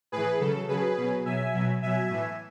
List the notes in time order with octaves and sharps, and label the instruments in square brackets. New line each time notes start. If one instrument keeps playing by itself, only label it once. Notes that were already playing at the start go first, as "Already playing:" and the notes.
[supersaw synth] A2 E3 G#4 B4
C#3 F#3 A4
C#3 F#3 G#4 B4
B2 F#3
B2 F#3 E5 G#5
B2 F#3
B2 F#3 E5 G#5
A2 E3